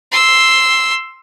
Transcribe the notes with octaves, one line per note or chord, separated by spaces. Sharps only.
C6 E6